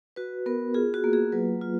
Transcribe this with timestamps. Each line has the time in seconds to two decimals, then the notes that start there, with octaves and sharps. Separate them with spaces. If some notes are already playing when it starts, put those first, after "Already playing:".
0.16 F#4 B4
0.46 B3 A#4
0.74 F4 G#4
0.94 F#4
1.04 A#3
1.13 G#4
1.32 F#3 B4
1.62 F4